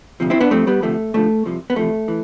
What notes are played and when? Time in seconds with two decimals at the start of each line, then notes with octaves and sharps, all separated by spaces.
0.20 D2 C3 F3
0.30 C4 E4
0.41 B3 D4
0.51 G2 F3 A3 C4
0.67 G3 B3
0.82 D2 C3 F3 A3
1.14 G2 D3 F3 A3
1.46 C2 C3 F3
1.70 B3
1.76 E2 C3 F3 A3
2.08 E3